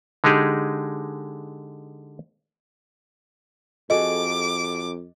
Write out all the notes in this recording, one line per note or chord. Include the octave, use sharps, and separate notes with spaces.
D3 G#3 D#4 G4 G#4
F2 F#4 G#4 A4 D#5 D6